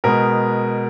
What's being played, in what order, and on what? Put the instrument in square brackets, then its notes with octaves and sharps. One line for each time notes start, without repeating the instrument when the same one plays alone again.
[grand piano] B2 G#3 B3 A#4